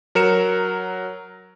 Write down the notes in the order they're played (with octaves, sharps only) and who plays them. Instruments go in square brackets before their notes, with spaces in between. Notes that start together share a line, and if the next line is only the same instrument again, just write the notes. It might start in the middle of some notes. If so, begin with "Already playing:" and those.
[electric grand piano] F#3 A#4 C#7 E7